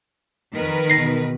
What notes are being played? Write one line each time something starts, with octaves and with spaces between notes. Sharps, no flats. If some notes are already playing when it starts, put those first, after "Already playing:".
F2 D#3 A#4 B4
E2 B2 A#6 C7